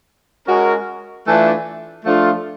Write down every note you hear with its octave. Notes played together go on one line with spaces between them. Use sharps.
G#3 C#4 F#4 A#4
E3 A3 D4 F4
F3 A3 D4 F4 A4